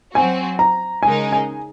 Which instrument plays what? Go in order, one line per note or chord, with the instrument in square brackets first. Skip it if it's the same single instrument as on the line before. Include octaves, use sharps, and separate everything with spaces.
[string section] F#3 C4 F#4 [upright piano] G#5
[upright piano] A#5
[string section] C#3 G#3 D#4 A#4 [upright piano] G#5
[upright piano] G#5